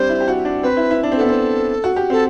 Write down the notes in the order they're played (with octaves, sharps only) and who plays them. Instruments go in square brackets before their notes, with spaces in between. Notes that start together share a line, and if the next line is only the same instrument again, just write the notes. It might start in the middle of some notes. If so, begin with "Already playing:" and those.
Already playing: [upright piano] G3 C4 D4 [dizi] C5
[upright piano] E4
G4
F#4
D4
[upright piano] C4 [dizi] B4
[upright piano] E4
E4
D4
C4
[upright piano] B3 [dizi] A4
[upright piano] C4
F#4
G4
[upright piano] C4 [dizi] A4